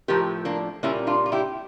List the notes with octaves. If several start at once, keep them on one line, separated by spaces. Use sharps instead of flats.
A2 F3 A3 G4 A#4
A#3 D4
A#2 G3 A#3 C#4 E4
D4 F4
F4
E4 G4